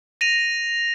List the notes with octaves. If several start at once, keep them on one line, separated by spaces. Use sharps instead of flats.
A#6 D#7 F7